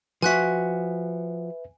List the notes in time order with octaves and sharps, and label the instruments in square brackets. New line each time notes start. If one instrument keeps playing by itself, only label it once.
[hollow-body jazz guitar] F3 F#4 [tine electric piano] B4 E5 [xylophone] G#5 F#6 B6